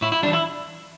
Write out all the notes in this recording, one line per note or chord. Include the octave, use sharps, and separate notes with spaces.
A2 E4
E4
E3 G3 D4
E4